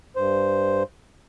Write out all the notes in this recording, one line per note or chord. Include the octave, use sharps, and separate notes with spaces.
G2 C5